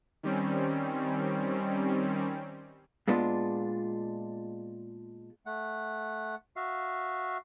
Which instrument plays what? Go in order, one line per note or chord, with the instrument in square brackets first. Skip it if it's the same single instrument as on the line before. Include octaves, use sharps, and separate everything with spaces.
[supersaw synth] D#3 G3 C4 C#4
[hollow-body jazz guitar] A#2 G#3 B3 D4 F4
[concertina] A3 F#5
F#4 E5 F5